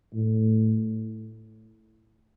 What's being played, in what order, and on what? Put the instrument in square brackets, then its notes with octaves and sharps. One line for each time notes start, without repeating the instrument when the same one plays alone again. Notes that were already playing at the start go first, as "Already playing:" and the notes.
[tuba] A2